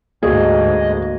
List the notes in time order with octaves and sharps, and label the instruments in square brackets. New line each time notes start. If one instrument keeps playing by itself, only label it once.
[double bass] D2 G#2 [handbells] A#3 F#4 [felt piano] G#4 [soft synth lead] D#5